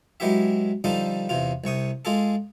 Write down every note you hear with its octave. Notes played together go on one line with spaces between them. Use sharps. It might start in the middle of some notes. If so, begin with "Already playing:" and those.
F#3 G#3 B3 E4 G4 E5
D3 F3 G3 D#4 F4 A4
E2 C3 F4
C2 C3 C#6 D#6
G#3 F4 G#4 A4